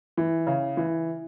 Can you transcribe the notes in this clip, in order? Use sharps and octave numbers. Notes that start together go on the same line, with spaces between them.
E3
C#3
E3